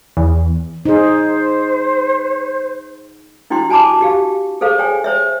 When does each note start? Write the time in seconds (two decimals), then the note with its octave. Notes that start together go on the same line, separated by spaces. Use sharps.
0.17 E2
0.85 D#4 G#4 C5
3.50 D4 E4 F#4 G5 C6
3.69 F#4 G#5 A5 B5 D6
4.01 F#4 G4 F5
4.61 G#4 A4 C5 F5
4.78 C#5 G5 G#5
5.04 C5 C#5 E5